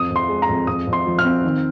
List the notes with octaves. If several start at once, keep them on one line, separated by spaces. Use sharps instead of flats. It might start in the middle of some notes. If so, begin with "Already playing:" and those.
Already playing: F2 D#6
F2
C6
G#3
A#5
F2
F2 D#6
F2
C6
F3
F6
C4
D#3